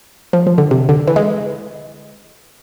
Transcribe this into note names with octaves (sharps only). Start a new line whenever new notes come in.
F3
F3
D3
C3
D3
E3
G#3